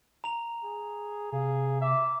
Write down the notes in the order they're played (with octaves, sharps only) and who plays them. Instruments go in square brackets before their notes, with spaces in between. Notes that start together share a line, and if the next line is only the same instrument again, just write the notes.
[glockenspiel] A#5 F7
[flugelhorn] G#4
[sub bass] C3 [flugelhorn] G#4 [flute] F5
[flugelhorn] E5 [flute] D6